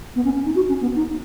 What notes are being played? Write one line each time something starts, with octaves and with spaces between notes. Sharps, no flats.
B3
C#4
C#4
D#4
F#4
C#4
B3
D#4